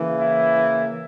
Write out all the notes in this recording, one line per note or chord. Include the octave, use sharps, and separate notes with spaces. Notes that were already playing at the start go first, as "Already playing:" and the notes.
Already playing: C#3 E3 A#3
E4